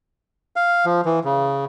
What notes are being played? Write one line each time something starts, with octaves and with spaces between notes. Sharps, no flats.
F5
F3
E3
C#3